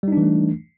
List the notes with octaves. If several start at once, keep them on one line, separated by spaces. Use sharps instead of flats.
E3 G3 A3 D4 D#4